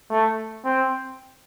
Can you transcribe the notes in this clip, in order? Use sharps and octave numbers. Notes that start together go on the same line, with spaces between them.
A3
C4